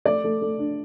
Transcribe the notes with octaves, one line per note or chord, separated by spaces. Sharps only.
A3 D5
A3
A3
D4